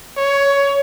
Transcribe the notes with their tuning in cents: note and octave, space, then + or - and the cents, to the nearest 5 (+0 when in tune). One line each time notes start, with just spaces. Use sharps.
C#5 +15